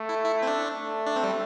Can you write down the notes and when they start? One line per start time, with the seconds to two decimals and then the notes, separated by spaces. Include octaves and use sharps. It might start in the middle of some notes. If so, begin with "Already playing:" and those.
Already playing: A3
0.09 E4
0.25 E4
0.43 C4
0.47 D4
0.70 A3
1.07 D4
1.16 C4
1.24 G3